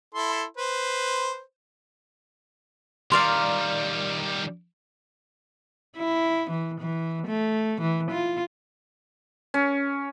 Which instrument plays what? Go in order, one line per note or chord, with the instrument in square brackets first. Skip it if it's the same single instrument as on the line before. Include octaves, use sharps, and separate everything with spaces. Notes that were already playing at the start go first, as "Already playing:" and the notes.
[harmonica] E4 A4 C6
B4 C5
[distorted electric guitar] D#3 G3 [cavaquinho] A#4 D5 F5 [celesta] C6
[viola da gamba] E4
E3
E3
A3
E3
F4
[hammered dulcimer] C#4